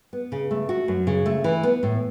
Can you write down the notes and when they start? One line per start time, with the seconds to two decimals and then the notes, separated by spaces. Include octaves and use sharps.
0.13 B3
0.32 C#3
0.51 A3
0.69 F#4
0.88 F#2
1.07 C#3
1.26 A3
1.44 E3
1.63 B3
1.83 A2